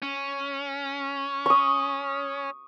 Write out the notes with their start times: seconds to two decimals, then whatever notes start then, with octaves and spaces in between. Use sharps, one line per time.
0.02 C#4
1.46 C#6 D#6